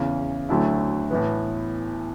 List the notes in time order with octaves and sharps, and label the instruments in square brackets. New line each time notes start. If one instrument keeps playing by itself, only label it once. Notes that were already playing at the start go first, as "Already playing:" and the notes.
Already playing: [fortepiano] E2 C#3 E3
D2 D3 F#3 A3 E4
A2 E3 B3